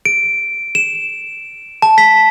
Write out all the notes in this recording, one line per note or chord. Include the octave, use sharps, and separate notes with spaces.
D7
E7
A5
B6